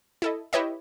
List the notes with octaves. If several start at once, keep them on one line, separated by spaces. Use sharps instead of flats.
E4 A4 D#5
E4 G4 B4 C#5 D#5 E5